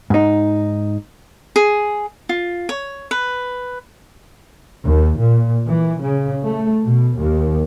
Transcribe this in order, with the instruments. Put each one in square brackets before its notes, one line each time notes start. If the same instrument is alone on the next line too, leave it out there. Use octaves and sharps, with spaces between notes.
[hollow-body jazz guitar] G#2 D#4
[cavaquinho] G#4
F4
C#5
B4
[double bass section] D#2
A#2
E3
C#3
A3
B2
D#2